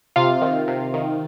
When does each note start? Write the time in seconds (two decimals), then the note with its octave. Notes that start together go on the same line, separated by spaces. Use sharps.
0.16 C3 F4 F5
0.42 D#3
0.68 C3
0.94 D#3